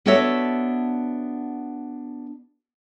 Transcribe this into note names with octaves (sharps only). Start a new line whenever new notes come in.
B3 D4 F#4 A4 C#5 E5